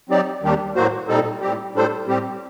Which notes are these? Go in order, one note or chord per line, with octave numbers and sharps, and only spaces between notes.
F#3 C4 D#4 G4 D5
D#2 D#3 G3 D4 G4
A2 F#3 A#3 F#4 C5
A#2 G3 C4 D#4 A4
A2 G3 C4 G4
A2 G3 D4 A4 C5
A2 G3 C4 G4